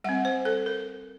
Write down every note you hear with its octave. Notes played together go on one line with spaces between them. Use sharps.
G3 C4 F#5
C5
A4
A#4